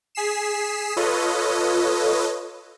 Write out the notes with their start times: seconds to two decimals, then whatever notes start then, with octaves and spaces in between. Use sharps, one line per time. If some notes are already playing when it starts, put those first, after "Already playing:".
0.15 G#4 B6 C7 E7
0.96 F4 A4 B4 C#5 D#5